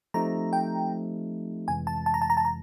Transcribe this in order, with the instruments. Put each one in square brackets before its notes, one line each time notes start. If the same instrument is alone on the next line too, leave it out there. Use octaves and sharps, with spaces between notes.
[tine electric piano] F3 A3 C4 D#4 G4 [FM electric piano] A#5
[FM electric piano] G5
[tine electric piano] F2 C3 E3 G#3 [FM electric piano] G#5
[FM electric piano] A5
A5
A#5
A5
A#5
A5
A#5